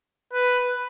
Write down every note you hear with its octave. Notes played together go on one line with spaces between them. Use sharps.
B4